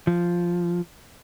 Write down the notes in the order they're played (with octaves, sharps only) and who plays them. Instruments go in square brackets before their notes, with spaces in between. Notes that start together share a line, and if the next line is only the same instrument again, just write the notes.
[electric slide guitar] F3